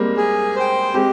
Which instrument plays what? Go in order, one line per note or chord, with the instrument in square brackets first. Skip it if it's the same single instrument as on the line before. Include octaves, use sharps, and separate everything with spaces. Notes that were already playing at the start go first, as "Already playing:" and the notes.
Already playing: [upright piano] G3 G#3 A#3 C4
[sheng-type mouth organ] G#4
C5 G5
[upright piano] G#3 C4 [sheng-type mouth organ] G4